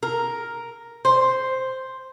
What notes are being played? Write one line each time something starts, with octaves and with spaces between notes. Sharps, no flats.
A#4
C5